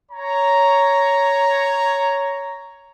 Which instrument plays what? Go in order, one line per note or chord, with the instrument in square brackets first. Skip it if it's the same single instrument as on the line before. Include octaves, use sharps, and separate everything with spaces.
[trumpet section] C#5 A#5